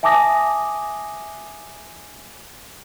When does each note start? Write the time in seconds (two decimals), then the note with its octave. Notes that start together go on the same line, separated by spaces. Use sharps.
0.03 E5 G#5 A5 D6 D#6 A#6